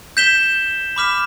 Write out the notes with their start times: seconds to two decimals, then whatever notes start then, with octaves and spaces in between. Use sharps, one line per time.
0.17 G6 B6 E7 G7
0.96 B5 D6 F6 B6 E7